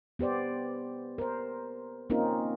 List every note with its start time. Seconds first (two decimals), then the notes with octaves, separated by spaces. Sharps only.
0.19 B3 G4 C5 D5
1.18 A#4 C5
2.10 A#3 C4 C#4 D#4 F4 A#4